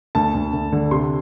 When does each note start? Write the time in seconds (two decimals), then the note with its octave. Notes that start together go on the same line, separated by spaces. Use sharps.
0.15 D2 A5
0.34 D2
0.53 D2
0.72 D3
0.91 C3 C6